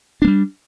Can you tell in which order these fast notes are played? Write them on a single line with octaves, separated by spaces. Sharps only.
D4 A#3 G3